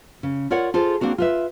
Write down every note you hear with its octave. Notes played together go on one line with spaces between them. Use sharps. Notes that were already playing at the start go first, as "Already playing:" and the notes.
C#3
F4 A#4 C#5 D5 F#5
F4 G#4 A4 C5
A#3 C4 D4 F#4
F4 B4 E5